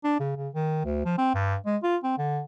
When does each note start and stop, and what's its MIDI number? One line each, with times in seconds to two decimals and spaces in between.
0.04 0.16 62
0.19 0.33 49
0.36 0.49 49
0.54 0.80 51
0.85 1.01 38
1.05 1.16 53
1.18 1.33 60
1.34 1.56 43
1.66 1.77 56
1.83 1.97 65
2.03 2.17 60
2.18 2.40 50